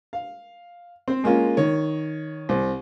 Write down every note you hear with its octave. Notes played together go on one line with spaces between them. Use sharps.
F5
C4 C5
G#3 A#3 C#4 F4
D#3 C#5
C2